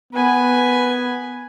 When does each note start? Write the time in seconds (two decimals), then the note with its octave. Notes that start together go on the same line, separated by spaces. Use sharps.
0.13 B3 B4 G#5